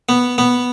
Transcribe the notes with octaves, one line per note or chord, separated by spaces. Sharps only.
B3
B3